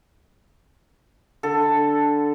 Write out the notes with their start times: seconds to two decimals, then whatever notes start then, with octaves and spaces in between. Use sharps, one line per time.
1.43 D3 A4